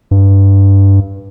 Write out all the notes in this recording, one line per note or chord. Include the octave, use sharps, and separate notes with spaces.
G2